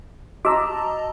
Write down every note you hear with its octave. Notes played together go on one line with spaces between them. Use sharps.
F#4 D#5 A5 A#5 D6 E6